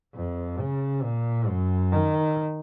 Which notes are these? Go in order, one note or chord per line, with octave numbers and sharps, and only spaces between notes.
F2
C#3
A#2
F#2
D#3